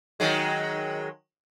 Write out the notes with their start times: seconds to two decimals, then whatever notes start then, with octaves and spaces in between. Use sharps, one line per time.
0.20 D#3 F#3 G#3